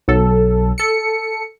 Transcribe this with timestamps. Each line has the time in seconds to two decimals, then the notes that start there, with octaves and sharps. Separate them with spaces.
0.08 B1 F#3 A4
0.78 A4 C#7